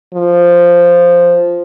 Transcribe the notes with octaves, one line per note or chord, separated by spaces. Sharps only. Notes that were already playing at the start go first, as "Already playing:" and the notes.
F3